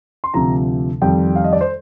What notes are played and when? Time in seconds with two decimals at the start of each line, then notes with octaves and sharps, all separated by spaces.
0.24 C6
0.34 D2 C3 F3 A#5
1.02 F2 D#3 G3 G5
1.36 F5
1.44 D#5
1.53 D5
1.61 C5